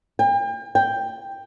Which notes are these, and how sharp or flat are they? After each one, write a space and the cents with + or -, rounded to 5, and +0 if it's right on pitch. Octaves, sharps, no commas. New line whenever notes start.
G5 +40
G5 +5